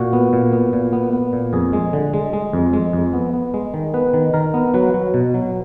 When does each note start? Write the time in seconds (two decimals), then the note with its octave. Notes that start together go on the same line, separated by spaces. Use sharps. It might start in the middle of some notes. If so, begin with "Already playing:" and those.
Already playing: A#2 F#4
0.13 B3
0.33 A#2
0.53 B3
0.73 A#2
0.93 B3
1.13 B3
1.33 A#2
1.53 F2 G#4
1.73 G#3
1.93 D3
2.14 G#3
2.33 G#3
2.53 F2
2.73 G#3
2.93 F2
3.13 B3
3.33 B3
3.54 G#3
3.74 D#3
3.94 B3 B4
4.14 D#3
4.34 D#3 A#4
4.54 B3
4.74 F#3 B4
4.94 F#3
5.14 B2
5.34 F#3